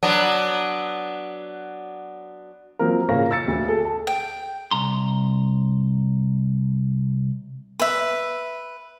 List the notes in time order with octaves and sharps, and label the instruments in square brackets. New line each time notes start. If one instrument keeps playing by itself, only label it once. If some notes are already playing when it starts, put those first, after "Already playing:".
[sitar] F#3 B3 D4
[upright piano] F3 F#3 A#3 C4 A#4
A#2 C#3 A#3 C#4 C#5 A#6
E6 A6 C#7
D2
G#4 A4
A5
[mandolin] G5
[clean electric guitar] C2 A#5 C6
[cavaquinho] B4 E5